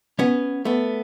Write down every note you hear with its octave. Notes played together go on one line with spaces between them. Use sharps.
B3 C#4
A3 B3